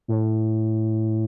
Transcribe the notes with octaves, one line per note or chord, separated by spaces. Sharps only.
A2